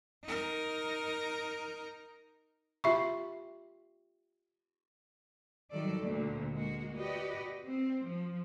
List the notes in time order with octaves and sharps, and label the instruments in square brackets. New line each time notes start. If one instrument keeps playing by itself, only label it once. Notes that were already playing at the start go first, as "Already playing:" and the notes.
[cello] D#4 A#4
[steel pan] F4 G4 B5 [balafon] E5 C#6
[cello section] D#3 F#3 G3 A4 D5
D2 A#2 D3
G#3 A#3 F#4
F#4 G4 B4 D5 D#5
C4
F3